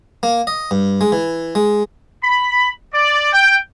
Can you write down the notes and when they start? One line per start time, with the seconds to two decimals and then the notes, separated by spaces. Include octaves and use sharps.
0.23 A#3
0.47 D#5
0.71 G2
1.01 G#3
1.12 E3
1.55 G#3
2.23 B5
2.93 D5
3.33 G5